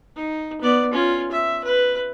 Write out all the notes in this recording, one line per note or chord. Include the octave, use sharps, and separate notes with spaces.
D#4
B3 D5
C#4 F4
E5
B4